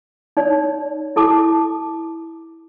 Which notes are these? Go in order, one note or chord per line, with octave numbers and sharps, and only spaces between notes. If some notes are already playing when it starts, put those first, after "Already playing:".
D#4 C#5 D5
E4 A4 A5 D6